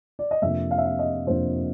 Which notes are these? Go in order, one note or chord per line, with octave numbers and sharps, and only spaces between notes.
D5
D#5
F2 C3 F3 A#3 D4 E5
F5
E5
F5
D#5
F2 C3 F3 A#3 D4 C5